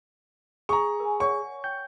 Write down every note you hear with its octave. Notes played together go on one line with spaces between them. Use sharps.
G#4 A#5 C#6
A#4 G#5
C#5 D5 F#5 C#6
G5 G6